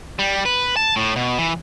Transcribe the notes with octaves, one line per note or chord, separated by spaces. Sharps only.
G3
B4
A5
A2
B2
E3